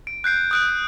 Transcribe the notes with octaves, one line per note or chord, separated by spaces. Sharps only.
D7
F#6 G6 C7 D7
D#6 F#6 D7